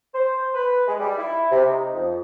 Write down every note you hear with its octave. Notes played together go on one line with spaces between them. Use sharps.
C5
B4
G#3
G3
E4
C3
D#4
F2